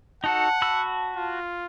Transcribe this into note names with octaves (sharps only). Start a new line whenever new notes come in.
D#4 F#4 A4 F#5 A5
F#4 B5 E6
F4